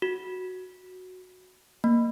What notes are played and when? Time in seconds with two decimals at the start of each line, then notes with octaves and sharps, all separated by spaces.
0.02 F#4
1.84 A#3